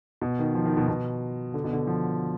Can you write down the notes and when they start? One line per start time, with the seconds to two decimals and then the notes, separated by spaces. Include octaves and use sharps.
0.22 B2
0.39 D#3
0.55 F3
0.66 D#3
0.77 B2
0.88 B2
1.54 D3
1.64 B2
1.73 D3
1.87 F3